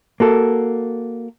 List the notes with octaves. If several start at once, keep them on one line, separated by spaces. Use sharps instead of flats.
A#3 F#4 A4